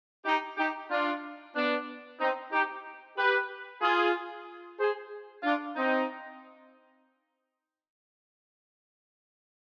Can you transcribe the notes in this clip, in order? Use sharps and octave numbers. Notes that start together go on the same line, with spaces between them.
D#4 G4
D#4 G4
D4 F4
B3 D4
C4 D#4
D#4 G4
G4 B4
F4 G#4
G#4 C5
D4 F4
C4 D#4